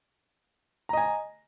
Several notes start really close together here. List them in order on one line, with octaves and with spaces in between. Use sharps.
A#5 D#5 G#5